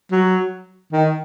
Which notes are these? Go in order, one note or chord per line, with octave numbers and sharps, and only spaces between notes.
F#3
D#3